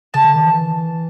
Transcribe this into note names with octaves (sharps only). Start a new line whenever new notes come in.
C#3 A5
D3
D#3
E3